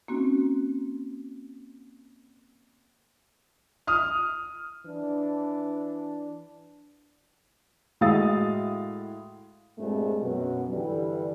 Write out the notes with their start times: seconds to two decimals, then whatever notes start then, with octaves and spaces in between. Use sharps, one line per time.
0.08 A#3 C4 C#4 D#4 F#4
3.87 D#6 F6
4.86 E3 D4
8.01 A2 G#3 F#4 F5 D#6 A6
9.78 G2 A#2 G#3 A3 C4
10.22 F#2 B2
10.70 G2 D3 E3 G3